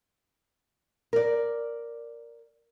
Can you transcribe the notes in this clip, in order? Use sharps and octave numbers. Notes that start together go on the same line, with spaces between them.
A#4 D5